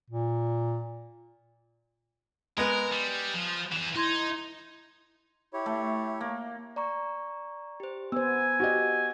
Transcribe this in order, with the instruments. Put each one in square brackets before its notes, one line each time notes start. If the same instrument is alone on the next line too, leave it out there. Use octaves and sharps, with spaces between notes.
[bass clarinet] A#2
[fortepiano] G#3 B3 [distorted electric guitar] A#4
[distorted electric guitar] G3
F3
[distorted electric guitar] E3 G#4 [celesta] E7
[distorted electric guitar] D#4 [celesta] E4 C6 G#6
[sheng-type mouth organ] E4 G4 C#5
[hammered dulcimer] A3
A#3
[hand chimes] D5 A#5 C#6
G4 C5
[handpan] B3 C5 [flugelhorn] G#5 [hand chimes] E6
[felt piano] F#4 G4 D#5